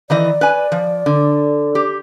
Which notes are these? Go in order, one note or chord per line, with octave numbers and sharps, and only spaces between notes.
D#3 E3 D5 D#5
B4 G#5
F3
D3
G4